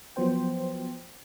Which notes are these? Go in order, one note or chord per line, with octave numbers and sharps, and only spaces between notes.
F3 F#3 B3 C5 G5